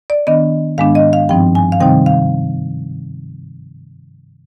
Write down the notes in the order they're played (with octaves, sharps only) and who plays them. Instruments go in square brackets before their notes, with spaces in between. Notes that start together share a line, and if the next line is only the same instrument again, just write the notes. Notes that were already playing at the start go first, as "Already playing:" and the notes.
[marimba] D5
D#3 B3 D4 D#5
G#2 D#3 G#3 B3 D4 F5
D#5
F5
G2 F3 C4 D#4 G5
G#5
F5
C3 D#3 G3 C4 D#4 G5
F5